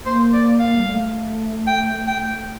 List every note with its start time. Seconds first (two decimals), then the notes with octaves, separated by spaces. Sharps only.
0.05 A#3 C5
0.33 D5
0.59 F5
0.77 G3
0.87 A3
1.67 G5
2.07 G5